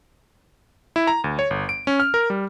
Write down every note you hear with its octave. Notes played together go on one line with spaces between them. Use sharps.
E4
A#5
D2
C#5
G1
D7
C#4
F6
A#4
G3